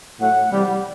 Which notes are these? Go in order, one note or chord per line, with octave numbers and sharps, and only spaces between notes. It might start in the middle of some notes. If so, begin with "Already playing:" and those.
A2 F#3 A3 F#5
C3 E3 G3